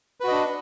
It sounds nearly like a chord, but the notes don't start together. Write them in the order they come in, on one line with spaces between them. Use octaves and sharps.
B4 F#4 D#5 D4